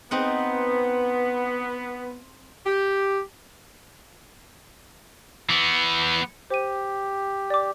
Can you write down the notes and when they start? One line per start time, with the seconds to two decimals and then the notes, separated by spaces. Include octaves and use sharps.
0.11 B3 C4 D#4 F#5
2.65 G4
5.50 E3 B3
6.50 G4 C5 D#7
7.50 D5 D6